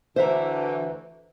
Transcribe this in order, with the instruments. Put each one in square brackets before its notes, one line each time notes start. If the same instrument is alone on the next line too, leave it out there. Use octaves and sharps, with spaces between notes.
[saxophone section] D2 D3 E3 [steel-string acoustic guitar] C5 E5 A#5